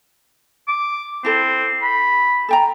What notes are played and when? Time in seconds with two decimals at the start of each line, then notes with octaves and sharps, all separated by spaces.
0.68 D6
1.25 C4 E4 A4
1.82 B5
2.49 A4 G5 A#5